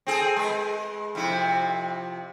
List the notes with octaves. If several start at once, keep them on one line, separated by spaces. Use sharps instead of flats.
C4 G#4 A4
G#3 B4
F2 C3 E4